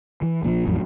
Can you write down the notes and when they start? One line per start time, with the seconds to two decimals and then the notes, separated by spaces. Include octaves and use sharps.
0.22 E3
0.43 A#1 A#2 C#3 F3
0.67 A1 F2 A2 F#3